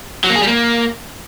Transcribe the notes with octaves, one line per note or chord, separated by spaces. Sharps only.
F#3
A#3
G#4
G3
A#3